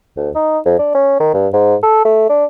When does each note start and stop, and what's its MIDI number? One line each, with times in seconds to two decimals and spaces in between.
0.17 0.30 38
0.35 0.59 63
0.65 0.76 41
0.79 0.92 62
0.95 1.20 61
1.20 1.30 51
1.34 1.48 43
1.53 1.75 44
1.83 2.04 69
2.05 2.25 57
2.29 2.45 62